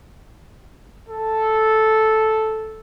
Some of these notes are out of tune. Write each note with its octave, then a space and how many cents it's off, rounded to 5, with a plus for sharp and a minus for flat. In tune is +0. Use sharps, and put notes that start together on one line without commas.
A4 -5